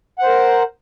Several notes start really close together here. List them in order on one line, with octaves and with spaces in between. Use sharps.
F#5 C5 A#4